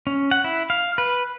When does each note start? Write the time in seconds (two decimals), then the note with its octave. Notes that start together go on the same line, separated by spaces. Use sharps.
0.07 C#4
0.31 F#5
0.44 E4
0.70 F5
0.98 B4